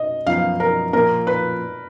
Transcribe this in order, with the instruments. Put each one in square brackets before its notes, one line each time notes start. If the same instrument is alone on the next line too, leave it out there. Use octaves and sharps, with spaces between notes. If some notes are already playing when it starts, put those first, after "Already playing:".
Already playing: [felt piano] D#5
[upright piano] F#2 F3 B3 [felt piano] F5
[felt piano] A#4
[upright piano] A#2 F3 A#3 F4 [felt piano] A#4
[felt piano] B4